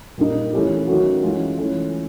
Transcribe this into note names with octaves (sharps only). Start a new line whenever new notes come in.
A#2 G3 A#3 D#4
E3 A3 C#4 E4 G4
D#3 F#3 A3 C#4 F#4
E3 G#3 C#4 F4
E3 A3 C#4 F4